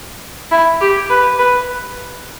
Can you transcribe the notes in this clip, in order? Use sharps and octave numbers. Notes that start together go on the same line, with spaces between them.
E4
G4
B4
B4